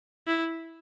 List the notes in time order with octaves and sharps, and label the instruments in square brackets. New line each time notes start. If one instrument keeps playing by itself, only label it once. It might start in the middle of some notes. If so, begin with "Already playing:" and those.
[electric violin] E4